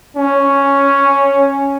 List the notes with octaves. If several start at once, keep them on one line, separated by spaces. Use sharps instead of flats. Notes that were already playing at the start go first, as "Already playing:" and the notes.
C#4